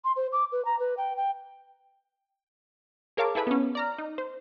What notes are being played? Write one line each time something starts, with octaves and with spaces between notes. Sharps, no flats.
C6
C5
D6
B4
A#5
B4
G5
G5
G#4 A#4 C#5 F5 A5 D6
E4 G#4 A4 B4 E5 B5
B3 C#4
D5 A#5 F6
D#4
C5